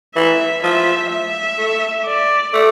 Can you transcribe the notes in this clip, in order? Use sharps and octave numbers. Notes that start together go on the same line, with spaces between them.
E3 E5
F3 E5
E5
A3
D5
A3